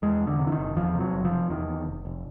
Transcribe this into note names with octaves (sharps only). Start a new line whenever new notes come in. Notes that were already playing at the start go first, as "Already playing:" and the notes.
E2 G#3
E2
D3
C3
E3
D#3
F#1
E2 F3
C3
F#3
F#1
F3
C3
E2 D#3
E2
F1
F1